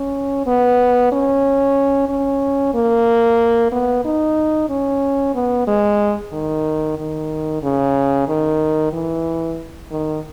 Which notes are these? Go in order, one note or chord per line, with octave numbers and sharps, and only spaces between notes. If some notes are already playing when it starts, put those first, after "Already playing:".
Already playing: C#4
B3
C#4
C#4
A#3
B3
D#4
C#4
B3
G#3
D#3
D#3
C#3
D#3
E3
D#3